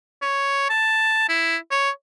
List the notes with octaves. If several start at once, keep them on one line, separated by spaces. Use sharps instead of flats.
C#5
A5
E4
C#5